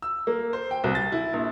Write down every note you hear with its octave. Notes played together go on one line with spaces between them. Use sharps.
E6
A#3
C5
G5
C2
A6
E4
A#1